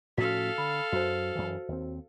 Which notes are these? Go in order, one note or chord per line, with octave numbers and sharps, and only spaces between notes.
A2 F3 C#4 F#4 A4 F5 B6
D3 B5
F#2 F#4 C5
F#2 E3
D#2 C4